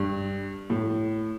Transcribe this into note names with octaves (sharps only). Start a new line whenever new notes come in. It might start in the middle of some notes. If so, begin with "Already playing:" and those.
Already playing: G2
A2